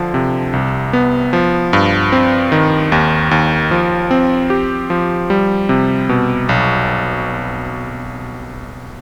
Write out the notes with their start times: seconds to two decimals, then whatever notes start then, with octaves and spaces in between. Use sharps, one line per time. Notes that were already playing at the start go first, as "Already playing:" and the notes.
Already playing: D3 F3
0.14 C3
0.53 C2
0.93 B3
1.33 F3
1.73 G2
2.12 C4
2.52 D#3
2.92 D#2
3.31 D#2
3.71 F3
4.11 C4
4.50 G4
4.90 F3
5.30 G3
5.69 C3
6.09 B2
6.49 B1